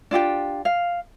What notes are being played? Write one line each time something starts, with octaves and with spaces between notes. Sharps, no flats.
D4 F4 G4 G5
F5